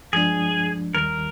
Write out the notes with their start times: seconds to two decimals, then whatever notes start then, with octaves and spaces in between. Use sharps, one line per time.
0.13 G2 F3 G#3 D4 G#4
0.95 D#2 D#3 G3 A#4